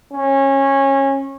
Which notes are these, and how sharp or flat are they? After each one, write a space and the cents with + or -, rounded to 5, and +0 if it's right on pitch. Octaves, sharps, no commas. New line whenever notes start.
C#4 -20